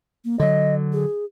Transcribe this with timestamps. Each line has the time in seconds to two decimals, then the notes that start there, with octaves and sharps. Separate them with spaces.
0.25 A#3
0.40 D3 F#3 D#5
0.93 G#4